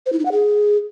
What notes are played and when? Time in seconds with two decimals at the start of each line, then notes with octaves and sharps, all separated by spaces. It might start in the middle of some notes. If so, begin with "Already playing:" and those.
0.06 C5
0.13 E4
0.19 D#4
0.25 F#5
0.32 G#4